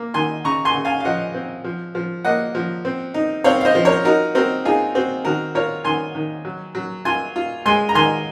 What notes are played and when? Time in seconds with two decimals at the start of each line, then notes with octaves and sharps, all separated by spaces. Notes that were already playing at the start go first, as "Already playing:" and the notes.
Already playing: A#3
0.14 D#3 G#5 C6
0.44 C#3 A#5 C#6
0.65 G#5 C6
0.74 C#3
0.85 F5 G#5
1.00 F5
1.05 F3 D#5 F#5
1.34 C4
1.64 F3
1.95 F3
2.25 A#3 D#5 F#5
2.55 F3
2.85 C4
3.14 D#4
3.44 C4 C#5 F5
3.61 F5
3.65 C5 D#5
3.75 F3
3.85 A#4 C#5
4.05 D#4 F#4 A#4
4.35 C4 F#4 A#4
4.65 D#4 F4 G#4
4.95 C4 F#4
5.25 D#3 F#4 A#4
5.55 F4 A#4 C#5
5.85 D#3 G#5 C6
6.15 D#3
6.45 F#3
6.75 F#3
7.05 F4 G#5 C6
7.36 F4
7.66 G#3 G#5 C6
7.89 A#5
7.95 D#3 G#5 C6